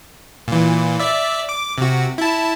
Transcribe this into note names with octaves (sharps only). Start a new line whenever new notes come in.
A#2 E3
D5 E5
D6
C3 F#4
E4 A5